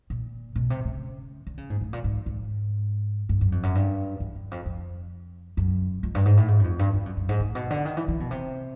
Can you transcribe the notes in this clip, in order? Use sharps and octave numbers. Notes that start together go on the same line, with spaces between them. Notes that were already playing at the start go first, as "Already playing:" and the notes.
A#2
B2
C3
C#3
D3
C#3
G#2
A2
A#2
G#2
G#2
G2
F#2
F2
F#2
G2
E2
E2
F2
F2
F#2
F2
G2
G#2
A2
G#2
F#2
F2
G2
G2
F#2
F#2
G#2
A2
B2
D3
D#3
E3
E3
B2
C3